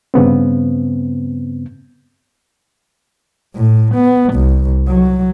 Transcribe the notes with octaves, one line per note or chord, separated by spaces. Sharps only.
G2 C#3 B3 C4
A2
B3
C2
F#3